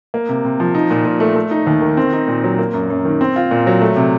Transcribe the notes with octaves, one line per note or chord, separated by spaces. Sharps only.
A#3
C3
C3
F3
D#4
A#2
A#2
A3
A3
D#4
D#2
D#3
C4
D#4
A#2
F#3
A#3
F#2
F#2
D#3
C4
F4
A#2
F#3
A3
C3